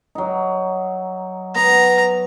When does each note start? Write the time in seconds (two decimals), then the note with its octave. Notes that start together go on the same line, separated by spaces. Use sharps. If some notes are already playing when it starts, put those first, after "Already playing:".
0.15 F#3 D#4
1.56 B3 A#5